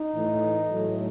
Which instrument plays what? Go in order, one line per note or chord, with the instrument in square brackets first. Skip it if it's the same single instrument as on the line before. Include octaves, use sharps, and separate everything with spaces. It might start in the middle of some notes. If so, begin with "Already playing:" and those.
Already playing: [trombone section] D#4
A2 E3 A3
A2 F#3 A3